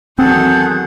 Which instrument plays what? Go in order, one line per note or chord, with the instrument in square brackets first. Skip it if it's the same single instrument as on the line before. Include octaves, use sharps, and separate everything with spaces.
[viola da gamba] E2 D#3 F#3 [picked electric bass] C4 [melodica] G#4 A4 F#5 [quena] G6